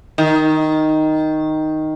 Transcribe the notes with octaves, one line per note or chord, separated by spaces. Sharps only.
D#3